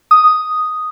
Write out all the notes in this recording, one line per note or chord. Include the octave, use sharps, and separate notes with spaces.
D#6